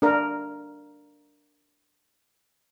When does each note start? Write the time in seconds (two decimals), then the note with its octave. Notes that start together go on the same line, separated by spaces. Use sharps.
0.02 D4 A#4